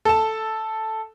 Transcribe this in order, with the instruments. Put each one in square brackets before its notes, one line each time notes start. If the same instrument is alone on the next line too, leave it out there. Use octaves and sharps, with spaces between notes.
[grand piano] A4 A5